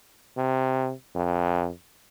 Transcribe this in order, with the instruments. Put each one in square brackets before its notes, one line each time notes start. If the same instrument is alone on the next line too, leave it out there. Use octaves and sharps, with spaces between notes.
[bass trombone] C3
F2